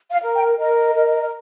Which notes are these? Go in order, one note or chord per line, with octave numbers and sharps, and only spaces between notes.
F5
A#4
G5
A#4 D#5
A#4